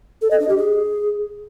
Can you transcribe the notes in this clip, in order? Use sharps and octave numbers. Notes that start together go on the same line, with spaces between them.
A4
D#5
D4
G4
G#4